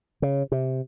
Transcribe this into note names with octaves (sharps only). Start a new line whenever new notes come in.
C#3
C3